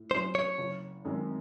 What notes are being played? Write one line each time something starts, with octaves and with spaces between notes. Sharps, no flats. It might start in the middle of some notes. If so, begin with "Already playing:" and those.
Already playing: A2
F#3 C#4 E4 C5
C#5
F#1
F#2 D#3 G#3 C4